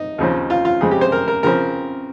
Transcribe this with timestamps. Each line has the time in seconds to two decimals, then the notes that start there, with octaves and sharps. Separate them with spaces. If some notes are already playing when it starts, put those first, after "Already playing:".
Already playing: D#4
0.18 D#2 C#3 F3 C4
0.50 F4
0.65 F4
0.81 F2 C#3 G#3 C4 G#4
0.91 G4
1.01 C5
1.12 A#4
1.28 A#4
1.43 C#3 F3 C4 A#4